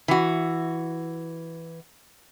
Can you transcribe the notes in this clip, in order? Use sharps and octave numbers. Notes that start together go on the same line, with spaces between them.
E3 F#4